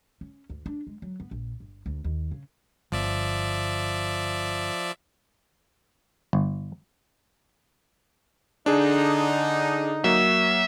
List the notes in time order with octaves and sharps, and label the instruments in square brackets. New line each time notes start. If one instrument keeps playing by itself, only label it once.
[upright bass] C#4
D2
D4
G#3
F#3
B3
A#1
G1
D2
D#2
C#3
[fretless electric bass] G1 [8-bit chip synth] F3 D5 E5
[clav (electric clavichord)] G1
[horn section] D3 D#4 [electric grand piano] D4 G#4
[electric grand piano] F#3 A#3 [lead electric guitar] E5